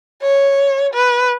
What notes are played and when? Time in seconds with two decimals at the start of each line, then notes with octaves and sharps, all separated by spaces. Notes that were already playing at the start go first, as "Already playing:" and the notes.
0.22 C#5
0.93 B4